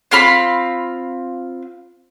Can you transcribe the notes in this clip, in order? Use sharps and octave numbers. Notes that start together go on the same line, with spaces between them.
C4 F4 F5 B5